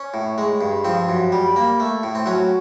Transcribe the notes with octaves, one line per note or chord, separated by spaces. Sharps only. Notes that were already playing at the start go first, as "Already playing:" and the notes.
Already playing: C#4
A2
G#3
G2
F3 C4
F#2
G3
A#3
A3
A2
C4
F#3 C#4